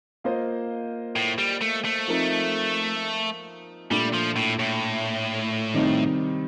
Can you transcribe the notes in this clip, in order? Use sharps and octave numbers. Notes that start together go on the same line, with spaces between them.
A#3 F4 C5 D#5
A2
G3
A3
A3
F3 C4 D#4 A#4
A#2 G3 A3 D4
F3
A2
A2
C3 D#3 G3 C4 D#4